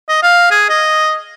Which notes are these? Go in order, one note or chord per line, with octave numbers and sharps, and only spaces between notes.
D#5
F5
G#4
D#5